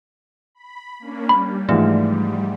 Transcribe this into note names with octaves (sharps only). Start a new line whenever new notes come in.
B5
A#3 C#4 D4
G3 B5
G#2 E3 F3 A3